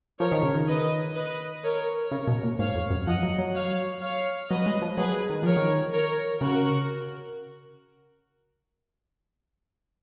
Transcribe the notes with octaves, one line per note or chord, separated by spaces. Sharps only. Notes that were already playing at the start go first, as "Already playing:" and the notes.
F3 A#4 C#5
D#3
C#3
D#3
B4 D#5
B4 D#5
A#4 C#5
C#3 A#4 C#5
B2
A#2
G#2 C#5 F5
F2
F#2
F3 D#5 F#5
F#3
F#3
C#5 F5
C#5 F5
F#3 B4 D#5
G#3
F3
F#3 G#4 B4
D#3
F3 A#4 C#5
D#3
A#4 C#5
C#3 F#4 A#4